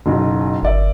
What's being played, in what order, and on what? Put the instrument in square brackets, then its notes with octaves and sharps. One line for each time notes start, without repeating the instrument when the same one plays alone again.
[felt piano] F#1 B1
[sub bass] G1 [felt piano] A#4 D5 E5